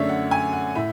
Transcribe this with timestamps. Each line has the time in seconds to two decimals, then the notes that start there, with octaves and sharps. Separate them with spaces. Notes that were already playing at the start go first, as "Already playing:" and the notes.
Already playing: F#2 D3 A3 C#5 D5 E5
0.09 F#5
0.31 G#5
0.53 F#5
0.75 A2 E5